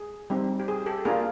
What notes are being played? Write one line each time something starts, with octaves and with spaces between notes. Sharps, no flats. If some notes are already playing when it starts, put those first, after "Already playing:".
Already playing: G#4
G3 C4 D#4
G4
G#4
G4 A4
A#3 D4 F4 G#4 A#4